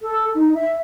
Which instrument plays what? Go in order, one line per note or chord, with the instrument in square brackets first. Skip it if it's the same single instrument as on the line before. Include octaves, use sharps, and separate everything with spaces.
[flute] A4
D#4
E5